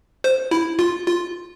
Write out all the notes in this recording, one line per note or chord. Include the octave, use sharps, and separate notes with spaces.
C5
E4
F4
F4